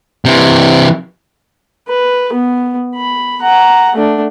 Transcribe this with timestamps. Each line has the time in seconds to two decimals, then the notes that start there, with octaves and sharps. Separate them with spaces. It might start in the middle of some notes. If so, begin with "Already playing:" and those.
0.25 C3 E3
1.88 B4
2.33 B3
2.95 B5
3.42 F#5 A#5
3.95 A3 D4